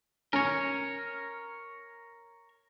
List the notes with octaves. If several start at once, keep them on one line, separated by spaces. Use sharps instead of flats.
C#4 A#4 C#5